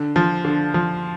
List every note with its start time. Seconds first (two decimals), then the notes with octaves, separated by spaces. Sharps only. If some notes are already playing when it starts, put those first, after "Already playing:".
Already playing: D3
0.16 F3
0.45 D3
0.74 F3